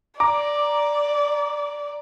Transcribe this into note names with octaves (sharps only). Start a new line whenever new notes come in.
D5 A#5 D6